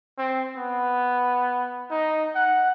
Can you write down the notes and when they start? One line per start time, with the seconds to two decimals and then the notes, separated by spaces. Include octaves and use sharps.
0.18 C4
0.57 B3
1.91 D#4
2.35 F#5